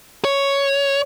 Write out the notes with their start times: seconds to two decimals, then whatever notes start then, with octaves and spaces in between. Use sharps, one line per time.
0.25 C#5